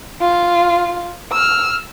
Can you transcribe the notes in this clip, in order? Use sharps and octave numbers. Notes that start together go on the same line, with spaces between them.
F4
E6 F6